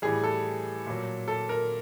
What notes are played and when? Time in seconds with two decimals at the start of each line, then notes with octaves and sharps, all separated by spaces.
0.02 A2 E3 G3 G#4
0.23 A4
0.87 A#2 F#3
1.28 A4
1.49 A#4